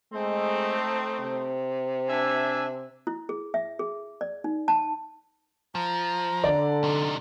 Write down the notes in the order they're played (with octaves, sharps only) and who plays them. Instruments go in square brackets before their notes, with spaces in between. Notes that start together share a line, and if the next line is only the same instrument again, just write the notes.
[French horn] G#3 [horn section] A3 C4 D#4
[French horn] C3
[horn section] D4 E5 G#5
[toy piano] E4
G#4
E5
G#4
D5
D#4
A5
[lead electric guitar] F3 [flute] A#5
[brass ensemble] D3 [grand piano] D5
[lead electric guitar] C3 D#4